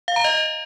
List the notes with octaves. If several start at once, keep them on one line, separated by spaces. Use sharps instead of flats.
F5
A#5
D#5